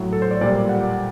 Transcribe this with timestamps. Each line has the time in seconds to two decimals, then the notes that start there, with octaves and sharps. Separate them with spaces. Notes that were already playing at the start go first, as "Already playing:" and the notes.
Already playing: A2 F#3
0.13 A4
0.22 C5
0.31 D5
0.41 A#2 G3 D5
0.69 F#5